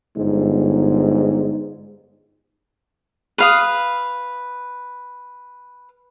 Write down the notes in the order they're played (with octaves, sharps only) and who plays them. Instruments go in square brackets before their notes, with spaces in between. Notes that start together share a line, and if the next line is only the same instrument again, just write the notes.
[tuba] G1 [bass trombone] G#2
[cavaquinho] B4 F5 D#6